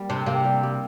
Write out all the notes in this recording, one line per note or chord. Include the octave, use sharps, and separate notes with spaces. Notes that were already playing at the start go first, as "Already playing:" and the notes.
Already playing: G3 A#3
C3 D4
C3 A#3
G3
G3